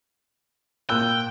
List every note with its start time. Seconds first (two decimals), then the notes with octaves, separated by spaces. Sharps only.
0.89 A#2 G5 E6 F#6